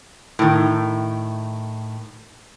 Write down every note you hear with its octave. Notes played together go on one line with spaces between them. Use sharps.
A2 D#3